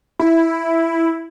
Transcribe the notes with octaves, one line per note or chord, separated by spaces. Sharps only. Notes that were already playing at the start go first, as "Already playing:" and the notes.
E4